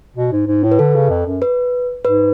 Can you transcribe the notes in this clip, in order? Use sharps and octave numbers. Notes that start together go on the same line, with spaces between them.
B2
G#2
G#2
A2
B4
D3 A4
C#3
F2
F#2
B4
G#2 B4